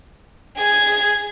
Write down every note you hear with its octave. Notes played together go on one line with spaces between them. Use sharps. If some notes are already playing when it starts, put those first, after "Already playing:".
G#4 G#6